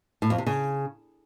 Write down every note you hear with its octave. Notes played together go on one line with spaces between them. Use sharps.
A2
F2
C3
C#3